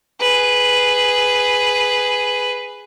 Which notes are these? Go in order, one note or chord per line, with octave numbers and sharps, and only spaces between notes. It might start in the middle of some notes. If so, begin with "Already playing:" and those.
G#4 B4